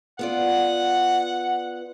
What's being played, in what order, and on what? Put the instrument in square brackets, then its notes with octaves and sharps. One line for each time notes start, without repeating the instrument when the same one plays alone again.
[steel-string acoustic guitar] B3 F4 D5 [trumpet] F#5